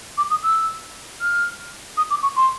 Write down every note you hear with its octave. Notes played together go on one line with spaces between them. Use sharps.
D6
D#6
E6
F6
D#6
D6
C#6
C6